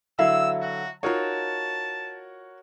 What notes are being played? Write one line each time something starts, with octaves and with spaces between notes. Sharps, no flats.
D3 F#3 E4 E5 F5 E6
F#4
D#4 F4 F#4 A#4 C#5 A5